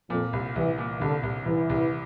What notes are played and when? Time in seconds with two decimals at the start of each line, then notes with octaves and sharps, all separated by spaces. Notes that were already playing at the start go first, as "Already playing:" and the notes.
0.10 F2 A#2
0.33 C2
0.56 C2 E3
0.78 A#2
1.00 C2 D3
1.23 C2
1.46 C2 E3
1.69 C2